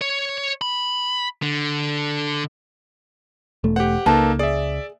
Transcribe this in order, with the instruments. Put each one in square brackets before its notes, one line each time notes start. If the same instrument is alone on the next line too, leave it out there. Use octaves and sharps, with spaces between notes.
[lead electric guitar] C#5
B5
D3
[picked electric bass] E1 A3
[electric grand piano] G4 F#5 [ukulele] C5
[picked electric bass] C#2 [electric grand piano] A#3 D#4 A4 [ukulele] B4 A5
[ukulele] G#4 [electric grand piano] D5 E5